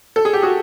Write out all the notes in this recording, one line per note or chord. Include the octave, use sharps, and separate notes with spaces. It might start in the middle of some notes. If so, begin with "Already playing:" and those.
A4
G#4
G4
F#4 G#4